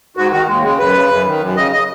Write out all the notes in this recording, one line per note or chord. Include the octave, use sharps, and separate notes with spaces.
G#2 F#4
D#3 F#4
D#2 G#3
C#3 G#3
F#2 B4
C#3
F#2
D#3
F#2
C#3 D#5
D#5